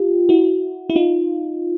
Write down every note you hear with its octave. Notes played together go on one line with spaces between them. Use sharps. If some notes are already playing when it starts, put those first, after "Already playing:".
Already playing: F4 G4
E4 F#4
E4
D#4 F4